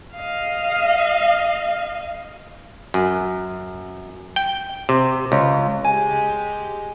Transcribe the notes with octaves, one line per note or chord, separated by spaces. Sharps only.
D#5 F5
F#2
G5
C3
C#2
G#3 G4 G#5